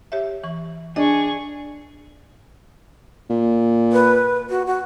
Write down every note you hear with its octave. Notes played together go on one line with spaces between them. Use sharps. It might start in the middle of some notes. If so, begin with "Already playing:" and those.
G4 C#5 E5
E3 C#6
D4 G#4 D#5 C#6
A#2
B4
F#4
F#4